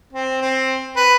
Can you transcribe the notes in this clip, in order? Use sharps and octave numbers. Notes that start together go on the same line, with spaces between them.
C4
C4
B4